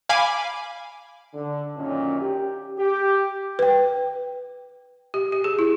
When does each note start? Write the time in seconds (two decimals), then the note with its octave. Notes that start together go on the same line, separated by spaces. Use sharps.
0.09 F5 G#5 B5 D6
1.34 D3
1.77 F#2 A#2 D#3 C#4
2.21 G4
2.78 G4
3.59 B4 G5
5.14 G4
5.32 G4
5.44 G#4
5.59 E4